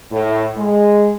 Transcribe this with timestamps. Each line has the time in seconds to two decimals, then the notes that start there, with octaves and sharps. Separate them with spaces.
0.11 A2
0.57 G#3